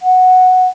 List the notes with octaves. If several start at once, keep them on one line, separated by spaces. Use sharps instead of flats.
F#5